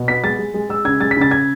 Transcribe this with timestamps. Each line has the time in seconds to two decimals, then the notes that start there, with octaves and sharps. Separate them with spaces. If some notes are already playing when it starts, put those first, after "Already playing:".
Already playing: B2
0.08 B3 B6
0.23 G#3 A6
0.39 G#3
0.54 G#3
0.69 G#3 E6
0.85 C#3 G#6
1.00 G#3 A6
1.11 B6
1.17 C#3 A6
1.31 G#6